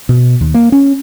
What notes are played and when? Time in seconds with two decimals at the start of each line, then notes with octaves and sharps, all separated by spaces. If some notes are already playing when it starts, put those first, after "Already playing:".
0.09 B2
0.41 D#2
0.54 A#3
0.72 C#4